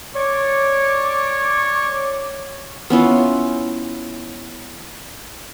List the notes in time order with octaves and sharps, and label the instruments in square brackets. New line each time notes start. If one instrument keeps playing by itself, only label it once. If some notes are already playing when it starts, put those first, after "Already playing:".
[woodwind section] C#5 D5 C#6 D6
[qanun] B3 C#4 E4 F4